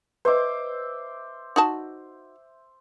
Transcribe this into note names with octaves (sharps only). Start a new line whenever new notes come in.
B4 C5 D#5 E5 D6
D#4 F#4 A5